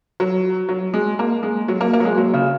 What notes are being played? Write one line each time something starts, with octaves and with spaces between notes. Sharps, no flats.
F#3
F#3
G#3
A#3
G#3
F#3
A#3
A#3
F#3
G#3
F#3
C#3